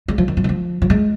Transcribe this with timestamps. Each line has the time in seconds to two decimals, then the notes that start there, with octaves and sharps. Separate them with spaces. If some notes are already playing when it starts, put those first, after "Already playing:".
0.08 G#3
0.18 F3
0.28 D#3
0.37 F3
0.44 D#3
0.49 F3
0.82 F3
0.90 G#3